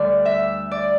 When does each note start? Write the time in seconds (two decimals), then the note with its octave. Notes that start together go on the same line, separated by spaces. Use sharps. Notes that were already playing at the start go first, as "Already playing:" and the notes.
Already playing: D2 D3 G3 D5
0.25 E5
0.71 D5